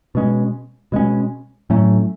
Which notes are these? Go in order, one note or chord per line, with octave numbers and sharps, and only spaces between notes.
B2 G#3 C#4
B2 G#3 C#4
A2 F#3 A3 C#4